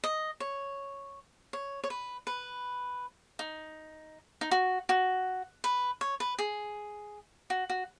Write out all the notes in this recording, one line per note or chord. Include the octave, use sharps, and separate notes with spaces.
D#5
C#5
C#5
C#5
B4
B4
D#4
D#4
F#4
F#4
B4
C#5
B4
G#4
F#4
F#4